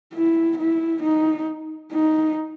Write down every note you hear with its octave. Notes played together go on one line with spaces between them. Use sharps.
E4
E4
D#4
D#4